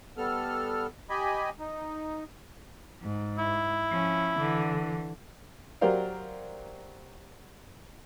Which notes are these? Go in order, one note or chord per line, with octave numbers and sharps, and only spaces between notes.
G3 B3 A4 F6
G4 D#5 G#5 B5
D#4
G#2
E4
F3 C#4
D3 E3
F#3 G4 A#4 C5 D5 F5